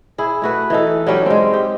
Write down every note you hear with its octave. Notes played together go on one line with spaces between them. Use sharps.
E4 G#4
A3 F#4 B4
E3 D#4 A4
F#3 G3 C#4 G4
G#3 C4
G4